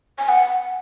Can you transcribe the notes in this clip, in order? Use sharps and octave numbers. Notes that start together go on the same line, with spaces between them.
G#5
F#5